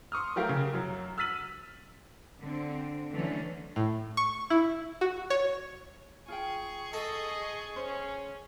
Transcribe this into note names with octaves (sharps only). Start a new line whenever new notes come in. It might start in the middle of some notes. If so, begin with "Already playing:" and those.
C6 C#6 D#6 F6
F#3 A3 G4 A#4 F5
C#3
F#2 F#3
E6 F6 A6 B6 D#7 F#7
D3 C4
D3 E3 F#3 A3 C#4
A2
C#6
E4
F#4
C#5
F4 G#4 G5 C#6
A4 D#5
C#4 C5